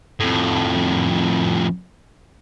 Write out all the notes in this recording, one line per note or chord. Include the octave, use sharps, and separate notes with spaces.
F2 A2